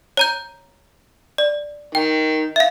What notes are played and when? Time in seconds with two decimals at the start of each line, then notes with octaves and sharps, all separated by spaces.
0.17 C#5 A#5 G6
1.38 D5
1.95 D#3 G5
2.56 E5 F5